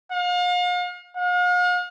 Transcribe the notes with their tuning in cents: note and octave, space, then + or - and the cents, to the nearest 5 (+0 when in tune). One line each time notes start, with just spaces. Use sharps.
F5 +40
F5 +45